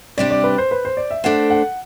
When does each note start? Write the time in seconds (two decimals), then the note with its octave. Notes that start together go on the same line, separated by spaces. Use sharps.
0.18 C3 G3 D4 G4 D5
0.31 D5
0.44 B4
0.58 C5
0.71 B4
0.85 C5
0.97 D5
1.11 E5
1.24 A3 D4 A4 C5 F#5
1.50 F#5